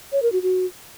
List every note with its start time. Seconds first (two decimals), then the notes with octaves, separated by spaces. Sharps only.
0.12 C#5
0.22 A#4
0.32 F#4
0.42 F#4